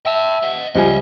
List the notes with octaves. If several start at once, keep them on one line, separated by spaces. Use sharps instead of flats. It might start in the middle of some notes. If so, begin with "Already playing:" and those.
E5 G5 A5
D#5 F#5
C#2 F3 G3 D#5 E5 G#5